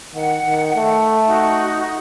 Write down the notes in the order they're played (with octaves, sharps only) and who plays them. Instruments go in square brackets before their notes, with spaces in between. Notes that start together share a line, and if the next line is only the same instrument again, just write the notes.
[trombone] D#3 [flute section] F#5
[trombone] D#3
A3
[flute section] D#4 F#4